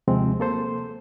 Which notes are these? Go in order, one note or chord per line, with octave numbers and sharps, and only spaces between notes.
D#2 C3 F3 G#3 C4
A#3 A4 C5